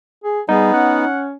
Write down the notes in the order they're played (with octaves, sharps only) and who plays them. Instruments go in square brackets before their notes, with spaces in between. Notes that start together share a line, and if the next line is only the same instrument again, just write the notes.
[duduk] G#4
[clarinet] G3 [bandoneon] B3 [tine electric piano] D#4 [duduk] G#4
[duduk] C#4 [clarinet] F#5